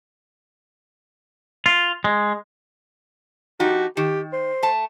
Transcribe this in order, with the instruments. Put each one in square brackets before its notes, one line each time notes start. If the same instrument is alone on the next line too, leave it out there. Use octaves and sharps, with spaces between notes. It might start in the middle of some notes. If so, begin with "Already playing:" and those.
[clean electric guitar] F4
G#3
[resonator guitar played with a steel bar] F3 D#4 G4 [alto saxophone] F#4
[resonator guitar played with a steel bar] D#3 [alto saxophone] G4
[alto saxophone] C5
[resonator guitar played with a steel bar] A3 A5